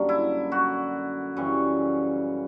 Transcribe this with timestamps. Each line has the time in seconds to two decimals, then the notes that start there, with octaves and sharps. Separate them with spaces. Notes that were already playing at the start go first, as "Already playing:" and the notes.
Already playing: F#2 D3 G3 A#3
0.09 E4
0.52 F#4
1.37 F#2 C#3 E3 G3